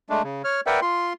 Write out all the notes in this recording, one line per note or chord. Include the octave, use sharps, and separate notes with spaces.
G#3 A3 D4
C#3
C#5 F6
A#4 B4 D5 E5 F#5 G5
F4 C6